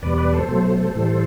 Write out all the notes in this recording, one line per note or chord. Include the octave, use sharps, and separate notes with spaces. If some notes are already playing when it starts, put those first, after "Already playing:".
E2 B2 G3 B4 D5
B4 D5
A4 C5
B2 F#3 A3 A4 C5
A2 E3 G3